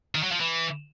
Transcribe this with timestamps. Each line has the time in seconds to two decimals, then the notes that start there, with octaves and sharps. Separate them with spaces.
0.15 D#3
0.23 F#3
0.32 F3
0.41 E3